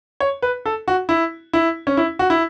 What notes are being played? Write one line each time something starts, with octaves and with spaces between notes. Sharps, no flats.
C#5
B4
A4
F#4
E4
E4
C#4
E4
F#4
E4